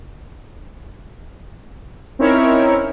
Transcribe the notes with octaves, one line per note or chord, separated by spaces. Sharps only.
C4 C#4 D#4 E4 A#4 C#5